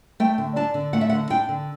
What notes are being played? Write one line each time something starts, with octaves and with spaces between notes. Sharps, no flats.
A3 G5
D3
D4 A5
D3
A3 F#5
E5
D3 F#5
D4 G5
D3